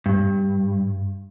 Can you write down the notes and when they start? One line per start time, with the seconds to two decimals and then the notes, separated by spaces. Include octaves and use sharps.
0.06 G2